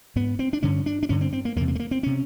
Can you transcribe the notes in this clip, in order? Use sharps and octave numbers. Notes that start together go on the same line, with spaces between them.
G#2 B3
C4
D4
G2 D3 C#4
D4
D4
G2 D3 C#4
C4
C4
A#3
E2 C3 A#3
A#3
A3
A#3
C4
C3 C#4